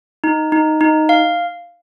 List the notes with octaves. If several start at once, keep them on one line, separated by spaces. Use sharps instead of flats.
D#4
D#4
D#4
F5